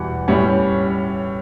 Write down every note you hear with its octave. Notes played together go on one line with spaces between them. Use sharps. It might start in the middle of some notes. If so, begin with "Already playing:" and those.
Already playing: E2 B2 G3 F#5
A2 G3 C#4